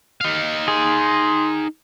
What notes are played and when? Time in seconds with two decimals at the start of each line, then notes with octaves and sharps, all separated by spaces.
0.21 D#4 F5
0.68 G#4 C6